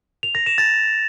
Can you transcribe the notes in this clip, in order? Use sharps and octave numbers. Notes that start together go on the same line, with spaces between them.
F7
A#6
E7
A6